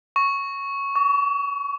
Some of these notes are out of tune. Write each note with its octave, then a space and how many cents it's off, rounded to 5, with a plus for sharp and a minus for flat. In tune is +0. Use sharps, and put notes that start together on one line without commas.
C#6 +0
C#6 +35